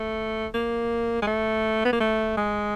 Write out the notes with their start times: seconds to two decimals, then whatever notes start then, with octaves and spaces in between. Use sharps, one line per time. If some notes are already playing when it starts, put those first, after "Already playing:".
Already playing: A3
0.54 A#3
1.22 G#3
1.27 A3
1.85 B3
1.93 A#3
2.00 A3
2.37 G#3